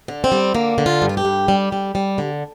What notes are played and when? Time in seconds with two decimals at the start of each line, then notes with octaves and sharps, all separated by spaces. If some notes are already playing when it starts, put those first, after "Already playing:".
0.08 D3
0.24 C4
0.32 G3
0.54 D3 A#3
0.78 D3
0.86 F4
1.02 G2
1.09 F4
1.17 G4
1.25 G2
1.48 G3
1.72 G3
1.95 G3
2.18 D3